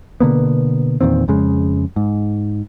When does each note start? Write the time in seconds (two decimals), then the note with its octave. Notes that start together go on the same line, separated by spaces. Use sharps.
0.20 B2 D3 A#3 B3
1.01 E2 A#2 D#3 C4
1.28 F2 C#3 G#3
1.96 G#2